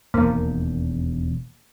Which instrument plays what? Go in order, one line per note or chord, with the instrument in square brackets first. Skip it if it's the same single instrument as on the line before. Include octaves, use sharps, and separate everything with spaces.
[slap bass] E1 D#2 [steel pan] A#3